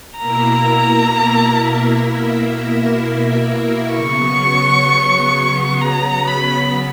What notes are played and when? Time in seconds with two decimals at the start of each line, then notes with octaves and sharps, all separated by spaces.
0.18 B2 A#3 E4 A#4 E5 A#5
3.93 C#3 F#3 B3 C#6
5.81 A#5
6.28 B5